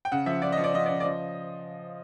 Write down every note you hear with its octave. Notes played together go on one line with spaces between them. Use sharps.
G5
C#3 F#5
F3 E5
F3 D5
D#5
F3
D5
F3 D#5
C#3 D5
D5
F3 D#5